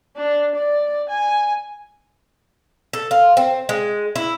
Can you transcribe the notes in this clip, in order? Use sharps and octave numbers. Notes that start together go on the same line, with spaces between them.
D4
D5
G#5
A4
F4
C4
G#3
E4